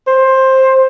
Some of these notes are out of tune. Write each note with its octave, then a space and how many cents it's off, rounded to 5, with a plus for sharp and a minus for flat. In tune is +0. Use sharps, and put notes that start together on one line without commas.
C5 +15